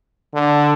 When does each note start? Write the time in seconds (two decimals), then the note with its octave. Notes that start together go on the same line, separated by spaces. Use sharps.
0.34 D3